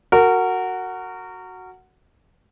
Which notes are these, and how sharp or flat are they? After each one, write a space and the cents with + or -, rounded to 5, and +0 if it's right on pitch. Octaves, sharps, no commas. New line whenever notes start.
F#4 +0 A#4 -25